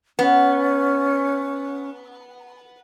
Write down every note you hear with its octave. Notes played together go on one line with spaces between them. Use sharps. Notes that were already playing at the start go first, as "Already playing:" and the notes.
B3 C#4